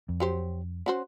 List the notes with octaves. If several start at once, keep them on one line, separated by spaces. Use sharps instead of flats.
F2
F#3 G4 C5
C#4 F#4 C5